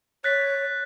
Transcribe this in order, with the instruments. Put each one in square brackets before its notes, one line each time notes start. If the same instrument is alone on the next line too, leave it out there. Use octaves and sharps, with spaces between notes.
[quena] C#5 [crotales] F#6 A6 B6